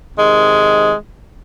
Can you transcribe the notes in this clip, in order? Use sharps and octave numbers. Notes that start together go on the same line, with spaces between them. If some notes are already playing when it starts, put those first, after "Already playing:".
C3 D#3 G#3